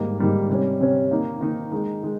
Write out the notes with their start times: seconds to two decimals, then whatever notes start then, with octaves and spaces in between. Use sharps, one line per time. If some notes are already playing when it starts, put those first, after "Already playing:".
Already playing: G#2 D#3 G3 A#3
0.18 G#2 D#3 G3 A#3
0.49 C3 G3 C#4
0.80 C3 G3 C#4
1.11 D#3 A#3 D#4
1.41 D#3 A#3 D#4
1.72 D#3 G#3 D#4
2.03 D#3 G#3